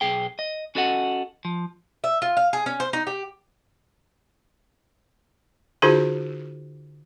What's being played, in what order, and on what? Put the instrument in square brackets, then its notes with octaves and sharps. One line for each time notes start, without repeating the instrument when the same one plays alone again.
[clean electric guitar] B1 G#4 G5
D#5
C#4 F#4 A4 D#5 F#5
F3
[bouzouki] E5
F4
F5
G#4
C#4
C5
D#4
G4
[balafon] D3 D#4 F4 F#4 G#4 C5